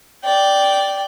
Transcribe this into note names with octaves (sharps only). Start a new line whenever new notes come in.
D5 G5